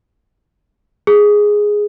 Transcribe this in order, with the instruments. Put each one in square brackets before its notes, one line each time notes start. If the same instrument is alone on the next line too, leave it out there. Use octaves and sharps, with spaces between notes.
[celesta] G#4